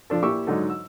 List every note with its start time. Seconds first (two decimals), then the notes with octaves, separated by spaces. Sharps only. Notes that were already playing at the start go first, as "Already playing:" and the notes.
0.10 F3 D4 A4
0.23 A#2 E4 G4 C#6 E6
0.47 G#2 D3 F#3 D#4 A4
0.70 E6